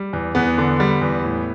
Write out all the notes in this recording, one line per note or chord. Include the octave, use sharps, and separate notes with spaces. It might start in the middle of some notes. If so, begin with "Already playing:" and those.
Already playing: G3
E2
E2 B3
D3
G3
E2
A2